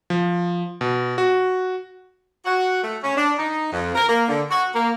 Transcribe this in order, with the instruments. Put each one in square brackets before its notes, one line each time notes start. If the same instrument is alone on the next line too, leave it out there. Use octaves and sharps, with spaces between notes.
[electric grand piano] F3
B2
F#4
[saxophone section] F#4
A3
C#4
D4
D#4
F2
A#4
A#3
D3
F#4
A#3